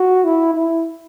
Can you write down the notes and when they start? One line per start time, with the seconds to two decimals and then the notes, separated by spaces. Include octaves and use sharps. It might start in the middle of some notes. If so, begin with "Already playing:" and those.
Already playing: F#4
0.24 E4
0.55 E4